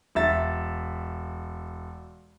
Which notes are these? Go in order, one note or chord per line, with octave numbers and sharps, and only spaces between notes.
E1 E5 A6